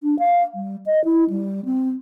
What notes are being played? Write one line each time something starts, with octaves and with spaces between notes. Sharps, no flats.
D4
F5
G3
D#5
E4
G3
C4